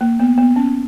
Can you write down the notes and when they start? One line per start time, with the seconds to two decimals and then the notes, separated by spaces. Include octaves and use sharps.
0.01 A#3
0.19 B3
0.38 B3
0.56 C#4